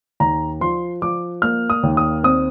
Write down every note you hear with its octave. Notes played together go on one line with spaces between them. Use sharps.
D#2 A#5
F3 C6
F3 D6
A#3 F6
D#6
D#2
D#6
C4 D#6